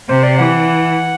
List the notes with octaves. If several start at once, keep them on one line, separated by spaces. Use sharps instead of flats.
C3 C5
D5
E3 F#5